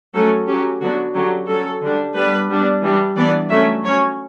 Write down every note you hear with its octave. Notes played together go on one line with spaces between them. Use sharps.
F#3 A3 C#4 A4
F#3 C#4 G4
D3 F#3 B3 D4 F#4
D3 F#3 C#4 G4
F#3 C#4 A4
D3 G3 D4
G3 B3 D4 B4
G3 B3 D4
E3 G3 D4
E3 B3 D4 D5
F#3 A3 C#4 E5
F#3 C#4 C#5